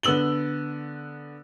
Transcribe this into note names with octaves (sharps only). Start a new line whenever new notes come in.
D3 B3 E6 F#7 G7